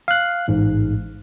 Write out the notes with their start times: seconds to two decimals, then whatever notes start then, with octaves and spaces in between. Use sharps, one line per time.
0.08 F5 F#6
0.48 A1 G#2 G#3